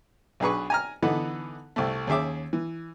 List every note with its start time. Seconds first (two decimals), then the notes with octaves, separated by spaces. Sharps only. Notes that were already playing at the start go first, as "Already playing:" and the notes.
0.40 B1 D4 G#4 B4 C#6
0.70 G#5 A#5 F6
1.02 D3 E3 B3 D#4 A4 B4
1.76 C2 A3
2.07 D#2 C#4 G#4 E5 D6
2.53 E3